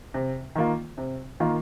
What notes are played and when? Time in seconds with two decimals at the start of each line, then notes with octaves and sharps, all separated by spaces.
0.14 C3
0.55 D#3 A#3 F4
0.98 C3
1.40 D#3 A#3 F4